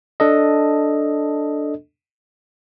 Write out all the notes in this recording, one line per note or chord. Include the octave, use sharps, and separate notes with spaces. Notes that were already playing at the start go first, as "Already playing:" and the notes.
D4 A4 D#5